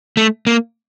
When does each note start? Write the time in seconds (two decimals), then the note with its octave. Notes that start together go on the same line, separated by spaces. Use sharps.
0.17 A3
0.47 A#3